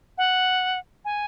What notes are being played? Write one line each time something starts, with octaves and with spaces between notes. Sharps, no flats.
F#5
G#5